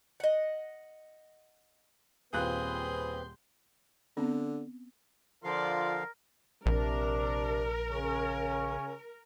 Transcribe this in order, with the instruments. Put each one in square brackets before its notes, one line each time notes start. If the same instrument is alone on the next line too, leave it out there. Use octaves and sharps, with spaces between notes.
[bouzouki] D#5 F#5
[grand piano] D#1 F4 F#6 [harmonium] C4 B4 [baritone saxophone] G#4 [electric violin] C6 G6
[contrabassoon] D3 [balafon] B3 C4
[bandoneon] D3 F3 F5 [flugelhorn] F4 [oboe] A#4 [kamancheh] D5 C6
[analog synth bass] A#1 [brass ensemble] C3 D4 [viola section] A#4
[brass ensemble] C#3 C#4